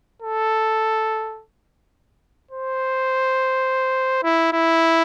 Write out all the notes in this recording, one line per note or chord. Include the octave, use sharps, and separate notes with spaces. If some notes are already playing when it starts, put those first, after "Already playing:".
A4
C5
E4
E4